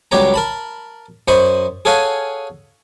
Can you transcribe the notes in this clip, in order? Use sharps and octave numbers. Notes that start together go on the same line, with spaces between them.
C#2 F#3 G3 G4 C#5 A#5
A#4 A5 B5
F#2 C5 D#5 B5 C#6
G#4 A4 C#5 F5 F#5 G#5